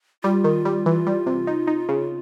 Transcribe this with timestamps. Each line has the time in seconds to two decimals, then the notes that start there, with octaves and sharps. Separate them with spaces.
0.23 G3 F4
0.44 D#3
0.65 G3
0.86 E3
1.07 G3
1.26 C3
1.47 D#4
1.67 D#4
1.89 C#3